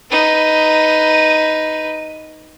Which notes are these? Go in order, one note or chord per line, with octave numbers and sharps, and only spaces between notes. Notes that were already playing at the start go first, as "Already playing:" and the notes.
D#4 B4